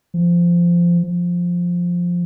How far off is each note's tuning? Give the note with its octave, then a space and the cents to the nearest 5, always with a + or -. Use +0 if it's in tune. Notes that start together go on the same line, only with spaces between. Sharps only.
F3 -15
F3 +5